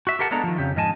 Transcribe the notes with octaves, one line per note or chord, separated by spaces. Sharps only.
F#4 E5
G4 A4 A#4 F#5 G5 A5
G#3 A#3 B3 D4 A4 A#5
D#3 F3
F2 C#3 G4
G#2 F3 D#5 G#5 A5